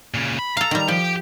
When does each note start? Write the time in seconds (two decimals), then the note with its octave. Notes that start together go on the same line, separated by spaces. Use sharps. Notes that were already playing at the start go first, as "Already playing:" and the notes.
0.14 A#2 C#3
0.39 B5
0.57 A4 F5 A#5
0.71 D#3 G3
0.88 F3 G4 G5